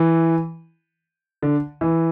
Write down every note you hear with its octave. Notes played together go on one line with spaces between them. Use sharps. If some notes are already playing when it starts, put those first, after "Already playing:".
Already playing: E3
D3
E3